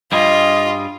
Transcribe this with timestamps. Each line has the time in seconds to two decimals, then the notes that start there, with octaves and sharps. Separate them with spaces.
0.12 G2 G3 F4 G#4 D#5